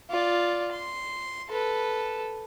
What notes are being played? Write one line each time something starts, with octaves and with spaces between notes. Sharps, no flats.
F4 D5
C6
A4 B4